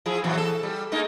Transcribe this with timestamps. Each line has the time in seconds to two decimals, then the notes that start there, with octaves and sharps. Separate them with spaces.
0.06 F3 E4 G#4
0.24 A#2 E3 F#3
0.37 A4
0.63 G3
0.92 G#3 A#3 D#4